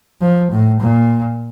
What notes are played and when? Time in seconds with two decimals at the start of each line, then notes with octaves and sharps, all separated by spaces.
0.21 F3
0.51 A2
0.80 A#2